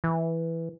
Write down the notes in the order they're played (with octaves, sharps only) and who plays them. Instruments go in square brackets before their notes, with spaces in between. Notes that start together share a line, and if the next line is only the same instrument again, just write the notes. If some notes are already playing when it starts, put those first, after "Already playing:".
[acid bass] E3